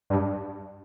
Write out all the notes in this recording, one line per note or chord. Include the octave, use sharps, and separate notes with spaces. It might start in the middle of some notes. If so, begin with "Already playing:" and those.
G2